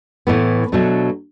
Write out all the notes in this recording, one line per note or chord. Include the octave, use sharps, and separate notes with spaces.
A2 E3 B3
B2 F#3 A3 D4